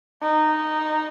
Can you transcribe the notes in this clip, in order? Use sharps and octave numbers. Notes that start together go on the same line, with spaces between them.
D#4